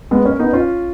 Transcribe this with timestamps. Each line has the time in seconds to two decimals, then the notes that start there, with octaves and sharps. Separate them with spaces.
0.11 G#3 B3
0.25 A#3 C#4
0.39 B3 D#4
0.53 C#4 F4